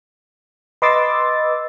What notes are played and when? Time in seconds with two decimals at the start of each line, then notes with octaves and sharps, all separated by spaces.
0.82 B4 D#5 C6 D6 E6 A6